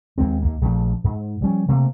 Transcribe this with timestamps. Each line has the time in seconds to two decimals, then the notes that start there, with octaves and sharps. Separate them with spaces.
0.18 D#2 G#3 C4
0.42 D#2 A#3
0.61 A#1 F3 A3 D4
1.04 G#2
1.40 F3 G3 C#4
1.68 C3 A3 A#3